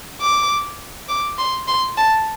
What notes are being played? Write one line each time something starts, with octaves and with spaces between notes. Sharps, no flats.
D6
D6
C6
C6
A5